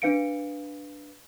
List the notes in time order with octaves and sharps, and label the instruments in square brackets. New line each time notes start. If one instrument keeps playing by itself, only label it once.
[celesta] D4 B4 F5 C#7 D7